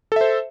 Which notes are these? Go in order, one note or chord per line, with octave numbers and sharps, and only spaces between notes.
A4 C5 E5